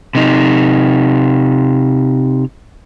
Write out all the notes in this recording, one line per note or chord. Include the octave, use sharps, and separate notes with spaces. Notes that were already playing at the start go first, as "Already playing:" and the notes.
C3 D#4